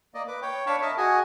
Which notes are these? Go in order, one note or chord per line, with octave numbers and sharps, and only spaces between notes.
A#3 D5 D#5
B4 D6
C#5 G5
D4 C#5 F5 A5 B5 C#6
A#4 D#5 E5 A5
F#4 G#4 D#5 G#5